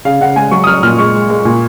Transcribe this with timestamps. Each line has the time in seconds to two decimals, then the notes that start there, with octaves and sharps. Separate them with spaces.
0.05 C#3 F5
0.21 C#3 F#5
0.36 G#3 G#5
0.51 F#3 C#6
0.64 D#6
0.67 F#3 F6
0.83 A#2 F6
0.98 G#3 C#6
1.14 G#3
1.30 G#3
1.45 A#2